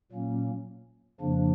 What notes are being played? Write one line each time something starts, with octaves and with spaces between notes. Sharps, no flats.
A#2 F#3 A#3 C#4
F2 C#3 F3 A#3 D4